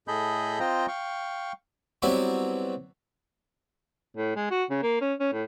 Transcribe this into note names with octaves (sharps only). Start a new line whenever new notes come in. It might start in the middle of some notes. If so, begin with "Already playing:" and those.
A2 G#4 A4 D#5 B5 G6
C4 F4 C5 D#5 G5 A#5
F5 G5 C#6
F#3 G3 B3 C4 E4 F#4
A2
G#3
F#4
C#3
A#3
C#4
C#4
A2